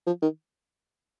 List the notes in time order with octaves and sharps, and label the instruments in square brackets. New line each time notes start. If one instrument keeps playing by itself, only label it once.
[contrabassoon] F3
D#3